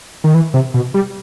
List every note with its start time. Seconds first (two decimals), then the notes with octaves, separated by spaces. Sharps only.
0.24 D#3
0.34 E3
0.54 C3
0.74 B2
0.94 G3